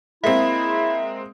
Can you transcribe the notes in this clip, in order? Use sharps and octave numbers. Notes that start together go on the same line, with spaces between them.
G#3 A#3 C4 E4 E5